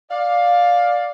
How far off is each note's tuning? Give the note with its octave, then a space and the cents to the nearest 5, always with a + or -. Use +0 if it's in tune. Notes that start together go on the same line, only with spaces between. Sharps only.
D5 +0 F5 +15